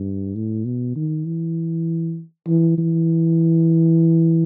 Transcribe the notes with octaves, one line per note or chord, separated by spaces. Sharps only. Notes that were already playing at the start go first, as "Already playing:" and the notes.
Already playing: G2
A2
B2
D#3
E3
E3
E3